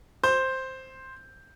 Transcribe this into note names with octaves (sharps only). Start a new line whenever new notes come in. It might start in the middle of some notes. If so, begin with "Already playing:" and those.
C5 G6